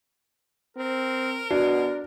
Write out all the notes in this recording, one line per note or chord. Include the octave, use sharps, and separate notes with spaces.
C4 A#4
B2 D4 F#4